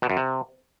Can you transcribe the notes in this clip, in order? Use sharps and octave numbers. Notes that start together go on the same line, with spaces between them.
B2
F#2
C3